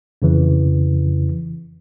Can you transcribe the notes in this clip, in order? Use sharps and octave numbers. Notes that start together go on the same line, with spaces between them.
F2 C#3 E3